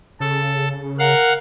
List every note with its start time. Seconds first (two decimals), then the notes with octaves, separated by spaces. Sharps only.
0.20 C#3 A4
0.99 A#4 F5 F#5